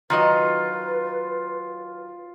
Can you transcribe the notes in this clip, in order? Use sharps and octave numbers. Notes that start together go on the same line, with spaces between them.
D#3 F#3 F4 B4 D#5